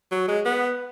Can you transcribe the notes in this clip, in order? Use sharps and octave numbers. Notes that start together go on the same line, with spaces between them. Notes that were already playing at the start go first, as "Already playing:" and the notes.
F#3
G#3
B3